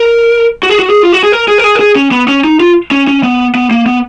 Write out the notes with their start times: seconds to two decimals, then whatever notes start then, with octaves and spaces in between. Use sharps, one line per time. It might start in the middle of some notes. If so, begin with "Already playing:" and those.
Already playing: A#4
0.63 F#4
0.69 G#4
0.79 F#4
0.90 G#4
1.03 F4
1.12 F#4
1.23 G#4
1.32 A#4
1.48 G#4
1.58 A#4
1.64 G#4
1.75 A#4
1.80 G#4
1.96 C#4
2.12 B3
2.28 C#4
2.44 D#4
2.60 F4
2.91 C#4
3.07 C#4
3.24 B3
3.55 B3
3.71 A#3
3.86 B3